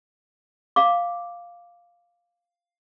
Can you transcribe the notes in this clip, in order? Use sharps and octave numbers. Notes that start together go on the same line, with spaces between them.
F5 D6